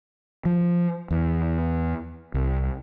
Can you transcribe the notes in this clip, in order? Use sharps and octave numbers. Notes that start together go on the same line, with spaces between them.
F3
E2
C2